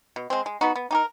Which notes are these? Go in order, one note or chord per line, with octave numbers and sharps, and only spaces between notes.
B2
G#3 C4
G#3
B3 D#4 F#4
B3
D#4 G4 A#4